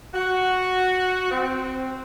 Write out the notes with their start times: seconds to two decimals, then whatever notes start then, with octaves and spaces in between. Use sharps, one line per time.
0.14 F#4
1.31 C4